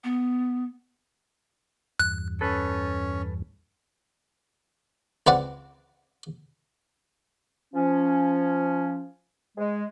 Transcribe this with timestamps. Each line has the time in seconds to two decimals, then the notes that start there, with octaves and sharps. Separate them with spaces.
0.04 B3
2.00 E2 G2 F#6
2.41 C#4 A4 B4
5.27 C#2 C4 B4 D5 F#5
7.74 F3 C#4
9.58 G#3